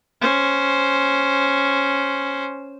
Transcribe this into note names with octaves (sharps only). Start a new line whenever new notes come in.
C#4 C5